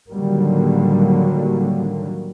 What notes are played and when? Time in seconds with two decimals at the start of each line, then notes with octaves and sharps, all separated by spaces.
0.11 A2 D3 D#3 F#3 G3 A#3